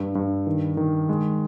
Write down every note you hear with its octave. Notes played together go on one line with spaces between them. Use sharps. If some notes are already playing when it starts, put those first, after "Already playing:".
Already playing: G2
G2
D#3
D#3
G#3